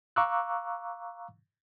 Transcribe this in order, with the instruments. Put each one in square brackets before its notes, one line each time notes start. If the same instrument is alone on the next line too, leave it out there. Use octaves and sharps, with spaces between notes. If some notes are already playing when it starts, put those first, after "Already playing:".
[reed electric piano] F5 A#5 C#6 D6 E6 F#6